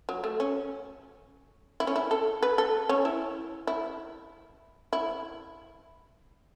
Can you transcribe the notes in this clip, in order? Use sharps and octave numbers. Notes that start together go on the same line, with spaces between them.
F#3
A3
C#4
E4
C#4
E4
A4
B4
A4
C#4
E4
E4
E4